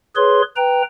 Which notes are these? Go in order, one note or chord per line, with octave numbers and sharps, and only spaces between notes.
G#4 B4 C#5 C6
B4 G5 A#5